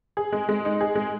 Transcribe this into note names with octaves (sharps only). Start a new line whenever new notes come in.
G#4
G#3
G#3
D#4
G#4
G#3